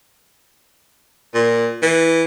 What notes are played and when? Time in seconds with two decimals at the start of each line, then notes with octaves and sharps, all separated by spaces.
1.34 A#2
1.82 E3